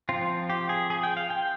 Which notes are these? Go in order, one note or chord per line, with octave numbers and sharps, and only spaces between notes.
F3 C4 F4
G4
G#4
G#4
G5
F5
G5